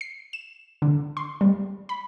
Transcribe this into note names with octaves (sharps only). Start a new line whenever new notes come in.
C7
E7
D3
C6
G3
B5